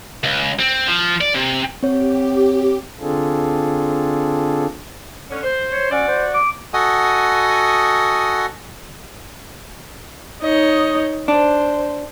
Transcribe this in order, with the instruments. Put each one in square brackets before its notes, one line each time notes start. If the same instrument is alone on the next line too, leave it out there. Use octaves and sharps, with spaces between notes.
[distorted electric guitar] C#2
C4
F3
D5
C3
[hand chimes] C4 C#5 [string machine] G4
[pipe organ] D3 C4 D4 F4 G#4 A4
[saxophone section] D3 C#4
C5
[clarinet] C#5
[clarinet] C#4 [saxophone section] F#4 D5
[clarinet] C5
D6
[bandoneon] F#4 A4 D#5 F#5 G#5 D#6
[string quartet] D#4 C#5 D#5
[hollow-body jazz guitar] D4 [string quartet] C5